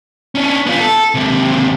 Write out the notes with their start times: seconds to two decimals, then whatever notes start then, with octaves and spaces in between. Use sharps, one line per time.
0.35 C#4 D4
0.66 B3 F4
0.80 A4
1.14 D#2 C3